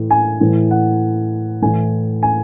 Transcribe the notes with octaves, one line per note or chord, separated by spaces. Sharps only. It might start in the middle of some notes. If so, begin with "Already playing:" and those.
Already playing: A2 E3
G#5
A2 E3
F#5
A2 E3 G#5
G#5